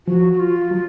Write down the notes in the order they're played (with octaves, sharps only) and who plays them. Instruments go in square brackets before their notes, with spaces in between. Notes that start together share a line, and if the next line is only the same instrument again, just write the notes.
[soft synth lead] F3 [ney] F#4
[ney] F#4
F4
[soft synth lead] F#3